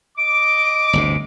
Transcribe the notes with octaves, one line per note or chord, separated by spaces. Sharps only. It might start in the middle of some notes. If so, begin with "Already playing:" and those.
D#5 D6 D7
G1 D2 C3